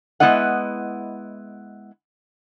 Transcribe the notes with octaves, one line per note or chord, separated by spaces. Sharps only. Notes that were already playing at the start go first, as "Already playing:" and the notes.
G#3 B3 E4 D#5 F#5